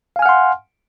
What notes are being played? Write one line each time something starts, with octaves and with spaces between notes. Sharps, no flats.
F5 F#5 G#5 C6 F6